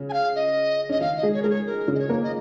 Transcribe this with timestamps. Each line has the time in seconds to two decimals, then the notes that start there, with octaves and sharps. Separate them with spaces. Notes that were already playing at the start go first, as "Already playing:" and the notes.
Already playing: C#3 C#4
0.10 G#5
0.13 F5
0.35 D#5
0.89 C#4 D#5
1.00 D#3 D#4 F5
1.17 D#5
1.23 G#3 G#4
1.33 C#5
1.42 G#3 G#4 A#4
1.50 C#5
1.67 A#4
1.88 C#3 C#4
1.95 D#5
1.99 C#5
2.09 A#3 A#4
2.23 D#5